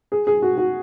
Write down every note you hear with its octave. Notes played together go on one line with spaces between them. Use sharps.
G#4
G#4
F#4
F#4